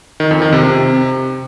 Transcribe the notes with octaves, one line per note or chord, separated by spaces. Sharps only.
D#3
F2
D#3
C3
C3